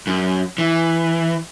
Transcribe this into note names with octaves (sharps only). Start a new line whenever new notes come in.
F#2
E3